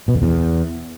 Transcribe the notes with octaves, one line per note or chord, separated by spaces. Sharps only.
B2
F2
E2